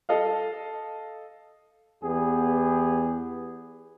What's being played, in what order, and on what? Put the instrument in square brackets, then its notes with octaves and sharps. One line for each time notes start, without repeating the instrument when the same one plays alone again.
[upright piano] A4 D#5 F5
[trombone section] E2 B3 G4 G#4